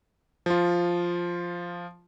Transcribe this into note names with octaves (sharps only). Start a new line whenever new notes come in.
F3 F4